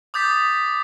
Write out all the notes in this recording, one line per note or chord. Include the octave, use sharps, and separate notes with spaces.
D6 D#6 G6 A6 B6